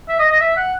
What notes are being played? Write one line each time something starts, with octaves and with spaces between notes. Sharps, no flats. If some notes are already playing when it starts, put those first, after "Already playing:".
E5
D#5
D#5
E5
F#5